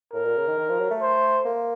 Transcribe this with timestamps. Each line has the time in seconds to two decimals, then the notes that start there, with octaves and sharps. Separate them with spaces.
0.14 A2 A#4
0.25 A#2
0.37 C#3
0.48 D#3
0.58 D#3
0.69 F3
0.80 F#3
0.91 A3
1.01 C5
1.45 A#3